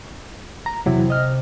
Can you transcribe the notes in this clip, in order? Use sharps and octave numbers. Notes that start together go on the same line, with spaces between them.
A#5
E2 C3 F#3 E4
D#5 F6